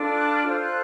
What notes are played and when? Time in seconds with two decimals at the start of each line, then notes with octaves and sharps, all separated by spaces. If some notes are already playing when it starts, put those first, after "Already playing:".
Already playing: D4 F4 A4
0.17 F#6
0.32 F6
0.46 F4 A4 C5 F6
0.61 F#6